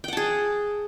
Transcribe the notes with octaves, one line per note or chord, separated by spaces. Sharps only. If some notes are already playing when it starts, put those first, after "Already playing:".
G#4 F#5 G5 A5